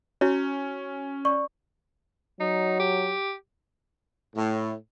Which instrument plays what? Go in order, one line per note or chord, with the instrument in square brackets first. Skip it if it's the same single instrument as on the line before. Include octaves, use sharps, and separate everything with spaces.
[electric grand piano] C#4 [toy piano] E4 F#4 C#5
[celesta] D5 C#6
[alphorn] F#3 [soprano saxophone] D#4
[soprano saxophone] G4
[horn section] A2